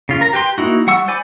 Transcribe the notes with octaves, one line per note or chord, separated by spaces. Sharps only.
C#3 F4
A#4 A#5
G4 B4 G5 C6
A#3 D#4 E4 F#4
G3 F#5 C#6 E6
C5 D5 G#5 B5 D6